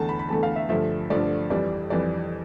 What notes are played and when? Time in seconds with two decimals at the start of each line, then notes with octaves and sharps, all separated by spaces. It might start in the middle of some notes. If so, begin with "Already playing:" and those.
Already playing: E2 D3 A3 A5
0.09 B5
0.19 B5
0.29 E2 D3 A3 A5
0.43 F5
0.56 E5
0.69 G2 D3 F3 A3 E5
1.10 G2 D3 F3 A3 D5
1.50 F2 E3 G3 D5
1.90 F2 E3 G3 D5